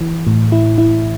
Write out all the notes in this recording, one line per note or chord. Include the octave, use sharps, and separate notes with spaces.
E3
A2
E4
E4